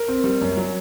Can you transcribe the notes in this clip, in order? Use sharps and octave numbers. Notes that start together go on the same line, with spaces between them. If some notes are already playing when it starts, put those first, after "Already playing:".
Already playing: A#4
C4
G3
F#2
F#3